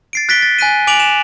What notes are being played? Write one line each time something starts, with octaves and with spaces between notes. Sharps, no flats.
A6 C7 D7
F#6 A6 B6 D7 G7
A6
G#5 F#6 B6 D#7
G#5 D6 D7 F7 F#7
E7